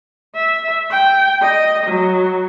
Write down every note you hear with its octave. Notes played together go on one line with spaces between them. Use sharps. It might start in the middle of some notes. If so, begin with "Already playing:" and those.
E5
G5
D#5
F#3